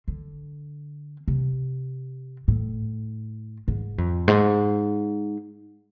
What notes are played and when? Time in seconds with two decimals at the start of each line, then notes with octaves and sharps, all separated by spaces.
0.08 D3
1.28 C3
2.48 A2
3.68 G#2
3.98 F2
4.28 G#2